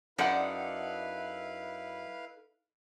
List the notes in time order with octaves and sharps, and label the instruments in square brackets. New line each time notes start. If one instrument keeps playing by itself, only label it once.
[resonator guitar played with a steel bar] F#2 F#5 [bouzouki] D#4 A4 D5 [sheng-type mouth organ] E4 B4 F5